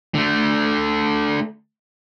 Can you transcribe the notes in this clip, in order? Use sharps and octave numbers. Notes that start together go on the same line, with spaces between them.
D3 A3